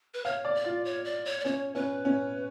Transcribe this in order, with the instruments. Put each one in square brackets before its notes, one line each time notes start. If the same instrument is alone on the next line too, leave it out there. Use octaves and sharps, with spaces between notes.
[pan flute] B4
[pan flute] C#5 [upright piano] F5
[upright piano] D5
[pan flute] D5
[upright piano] F4
[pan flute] C#5
D5
C#5
D5
[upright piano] C#4 [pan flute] C#5
[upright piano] C#4 [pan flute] B4
[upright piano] C#4